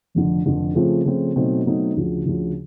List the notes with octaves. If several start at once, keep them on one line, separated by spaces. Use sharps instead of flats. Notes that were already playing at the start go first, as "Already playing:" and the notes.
F1 F2 D3
F1 F2 D3
C#3 F3 A3 C4 F4
C#3 F3 A3 C4 F4
B2 F#3 A3 C4 D#4
B2 F#3 A3 C4 D#4
D2 C#3 F3
D2 C#3 F3